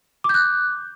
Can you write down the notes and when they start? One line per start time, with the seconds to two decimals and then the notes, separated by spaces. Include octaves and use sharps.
0.24 D6
0.29 G6
0.34 F#6